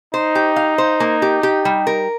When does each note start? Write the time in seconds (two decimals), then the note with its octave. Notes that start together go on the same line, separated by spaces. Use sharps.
0.14 D#4 C5
0.35 G4
0.56 F5
0.78 C5
1.00 A#3
1.22 G4
1.43 G4
1.65 G3
1.87 A#4